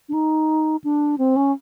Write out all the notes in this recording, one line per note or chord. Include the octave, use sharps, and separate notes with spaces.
D4
D#4
D4
C4
C#4